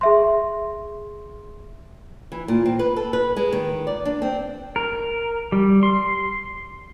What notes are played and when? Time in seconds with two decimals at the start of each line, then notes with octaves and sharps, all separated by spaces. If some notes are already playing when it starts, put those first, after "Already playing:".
0.01 G#4 E5 C6
2.32 E3
2.48 A#2
2.66 C4
2.79 B4
2.96 A4
3.13 B4
3.37 G#3
3.52 D#3
3.87 D5
4.05 D4
4.22 C4
4.76 A#4
5.52 G3
5.83 C6